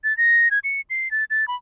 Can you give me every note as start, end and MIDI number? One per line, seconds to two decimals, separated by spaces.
0.04 0.16 93
0.17 0.51 94
0.51 0.59 92
0.64 0.81 97
0.90 1.11 96
1.11 1.24 93
1.30 1.47 93
1.48 1.56 83